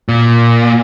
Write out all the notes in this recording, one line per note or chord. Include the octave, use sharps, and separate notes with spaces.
A#2